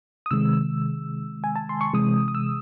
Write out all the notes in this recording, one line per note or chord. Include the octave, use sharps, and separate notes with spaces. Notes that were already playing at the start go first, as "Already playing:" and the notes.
D#6
C3 D#3 G#3 E6
G#5
A5
C6
C#6
C3 E3 G#3 D#6
D#6
E6